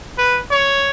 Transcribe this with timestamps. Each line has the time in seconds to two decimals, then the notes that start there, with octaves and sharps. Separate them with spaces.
0.18 B4
0.51 C#5